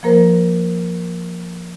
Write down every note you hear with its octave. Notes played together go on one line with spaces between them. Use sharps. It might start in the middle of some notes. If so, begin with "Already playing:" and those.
F3 A#3 A#4 C5